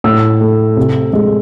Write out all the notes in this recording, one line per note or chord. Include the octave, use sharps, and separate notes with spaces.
A2 E6
A3
C3
G#3